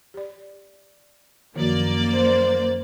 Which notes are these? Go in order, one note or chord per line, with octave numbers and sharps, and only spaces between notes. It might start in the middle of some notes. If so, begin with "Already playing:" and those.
G4 D5
F#2 D#3 F3 A#3 F#4 D5
C5